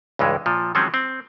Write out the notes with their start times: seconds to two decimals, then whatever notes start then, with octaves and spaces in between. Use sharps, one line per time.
0.19 C#2 G2 E3 G#3
0.46 A#2 F3
0.75 D#3 F3 F#3 G#3 C4 C#4
0.94 C4